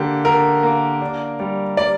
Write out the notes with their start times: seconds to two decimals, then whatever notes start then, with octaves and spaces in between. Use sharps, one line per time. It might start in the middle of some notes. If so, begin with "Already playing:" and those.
Already playing: D3 A#3 G4
0.25 D3 A#4
0.63 A#3
1.01 D4
1.40 G3
1.77 G3 D5